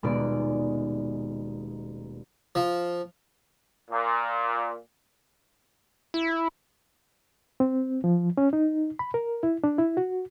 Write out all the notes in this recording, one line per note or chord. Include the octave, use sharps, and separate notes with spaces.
D#1 B2 G#3 D#4 D5
F3
A#2
E4
C4
F3
C#4
D#4
B5
A#4
E4
D4
E4
F#4